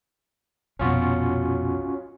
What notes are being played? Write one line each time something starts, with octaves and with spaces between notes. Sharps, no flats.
A#1 F2 B2 C#4 F4 F#4